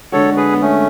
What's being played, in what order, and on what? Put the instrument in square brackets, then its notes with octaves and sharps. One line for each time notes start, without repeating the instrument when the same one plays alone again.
[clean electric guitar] D3 G#3 D4 F#4 [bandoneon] A4 C#5
[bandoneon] G#4 B4
B3
A3 C#4